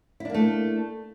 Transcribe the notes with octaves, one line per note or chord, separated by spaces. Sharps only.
A3 A#3 D4 E4